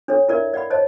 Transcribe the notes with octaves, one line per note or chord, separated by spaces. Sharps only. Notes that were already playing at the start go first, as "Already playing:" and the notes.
D4 A4 C#5
E4 A#4 D5 E5
D5 F#5 B5
C5 C#5 D#5 A5